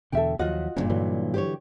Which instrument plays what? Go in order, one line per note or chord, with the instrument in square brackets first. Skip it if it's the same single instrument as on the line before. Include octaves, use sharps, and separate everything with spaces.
[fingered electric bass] E2 B2 D3 [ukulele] A4 E5 G5
[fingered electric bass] D#2 F3 F#3 [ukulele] F4 F#4 D#5 [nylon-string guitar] F#5
[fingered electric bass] G1 C#3 [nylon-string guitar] E2 G2 A#2
[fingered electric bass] D3 E3 F#3
[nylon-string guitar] G4 C5 C#5